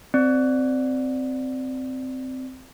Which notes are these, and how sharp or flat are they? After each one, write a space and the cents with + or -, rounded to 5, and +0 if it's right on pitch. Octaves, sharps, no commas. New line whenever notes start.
C4 -10 D5 +0